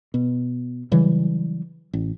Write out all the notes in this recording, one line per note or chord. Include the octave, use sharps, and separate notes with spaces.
B2
C#3 E3 F#3 G3
A1